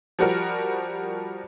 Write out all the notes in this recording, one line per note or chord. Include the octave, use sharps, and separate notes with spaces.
F3 G3 F#4 G4 A#4